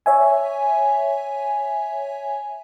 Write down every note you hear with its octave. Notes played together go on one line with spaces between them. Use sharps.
C#5 E5 G#5